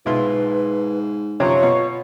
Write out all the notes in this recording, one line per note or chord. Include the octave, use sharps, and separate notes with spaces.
B1 G#2 E4 F4 B4
F#2 C3 F3 F4 C#5
B2